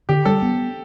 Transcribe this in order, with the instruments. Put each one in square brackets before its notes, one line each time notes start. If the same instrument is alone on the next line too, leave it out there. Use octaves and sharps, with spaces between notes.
[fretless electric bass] D3 [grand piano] G4
[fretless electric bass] G3 [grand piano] A4
[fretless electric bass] B3